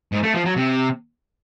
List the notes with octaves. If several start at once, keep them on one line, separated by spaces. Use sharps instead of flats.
G#2
A3
F3
F#3
C3